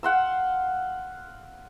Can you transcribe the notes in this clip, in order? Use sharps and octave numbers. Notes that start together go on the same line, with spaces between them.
F5 F#5 C6 E6